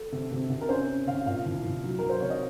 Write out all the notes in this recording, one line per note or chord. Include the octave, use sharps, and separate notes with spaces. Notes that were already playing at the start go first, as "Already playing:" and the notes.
Already playing: A4
C3
C3
C3
A#4
C#4 C5
C#4
C3 F5
A#2 F5
C2
C2
F#3
F#3 A#4
C5
C3 C#5
D#5